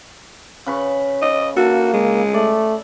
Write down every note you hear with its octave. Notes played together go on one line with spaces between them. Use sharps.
C#3 B4 C#6
D#5
A#3 F#4 A4
G#3
A3 D5